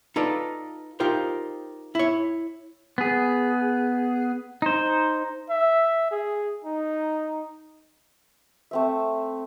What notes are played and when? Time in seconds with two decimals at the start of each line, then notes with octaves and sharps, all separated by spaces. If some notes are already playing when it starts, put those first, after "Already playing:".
0.16 D#4 F4 A4 B4 D5
1.00 D#4 F4 G4 A#4 C5
1.95 E4 C#5
2.98 B3 G#4
4.62 D#4 C5
5.50 E5
6.11 G#4
6.65 D#4
8.71 A3 C4 E5